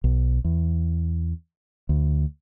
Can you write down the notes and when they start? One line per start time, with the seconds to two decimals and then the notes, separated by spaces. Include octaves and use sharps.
0.04 B1
0.44 E2
1.89 D2